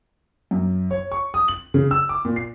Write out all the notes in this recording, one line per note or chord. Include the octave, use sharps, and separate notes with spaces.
F#2
C#5
C#6
D#6
F#7
C#3
E6
D6
A#2
C7